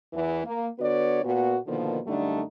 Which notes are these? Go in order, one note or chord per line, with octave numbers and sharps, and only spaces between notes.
E2 E3
A#3
D3 B3 F#4 B4 C#5 D5
A#2 B3 F#4
B2 D3 D#3 F3 A#3
F#2 D3 G3 A3 D4 D#4